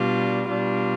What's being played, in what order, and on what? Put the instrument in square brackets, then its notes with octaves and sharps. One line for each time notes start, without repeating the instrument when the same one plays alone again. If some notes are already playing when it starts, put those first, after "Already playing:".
Already playing: [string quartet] B2 G3 D4 F4
B2 G3 D4 F4